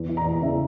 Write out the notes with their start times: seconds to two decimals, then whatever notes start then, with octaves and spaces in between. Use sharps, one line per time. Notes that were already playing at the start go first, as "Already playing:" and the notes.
Already playing: E2
0.09 E3
0.17 A#5
0.26 E2
0.42 C#3 E5